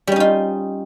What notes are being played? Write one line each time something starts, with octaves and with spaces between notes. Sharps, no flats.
G3 C#4 D#4 F4